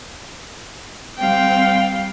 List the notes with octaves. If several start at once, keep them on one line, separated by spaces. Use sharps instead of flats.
G3 C4 F5 G5